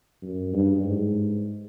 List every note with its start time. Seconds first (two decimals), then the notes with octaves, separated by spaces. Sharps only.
0.22 F#2
0.53 G2
0.84 G#2